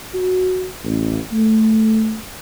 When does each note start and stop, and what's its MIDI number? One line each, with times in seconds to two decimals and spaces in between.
0.14 0.66 66
0.84 1.19 33
1.32 2.18 57